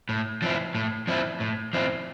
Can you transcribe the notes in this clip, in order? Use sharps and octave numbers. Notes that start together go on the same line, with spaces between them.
A2
F3 C4 E4
A2
F3 C4 E4
A2
F3 C4 E4